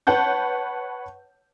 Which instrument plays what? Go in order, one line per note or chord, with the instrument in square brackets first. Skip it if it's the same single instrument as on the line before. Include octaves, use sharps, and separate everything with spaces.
[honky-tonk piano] B4 C#5 F#5 A5 G6